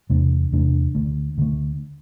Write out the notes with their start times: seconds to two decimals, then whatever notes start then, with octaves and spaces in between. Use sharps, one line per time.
0.10 E2 C3 A3 D4
0.52 E2 C3 A3 D4
0.95 D2 D3 A3
1.38 D2 D3 A3